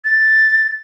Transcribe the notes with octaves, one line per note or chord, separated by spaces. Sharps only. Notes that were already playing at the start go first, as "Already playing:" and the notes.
A6